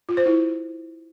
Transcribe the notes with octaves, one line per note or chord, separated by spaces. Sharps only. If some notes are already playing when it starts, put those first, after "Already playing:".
F4
C5
E4